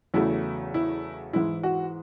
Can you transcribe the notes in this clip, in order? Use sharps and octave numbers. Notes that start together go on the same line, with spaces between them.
E2 C#3 F#3 A3 E4
E4
G#2 E3 G#3 E4
F#4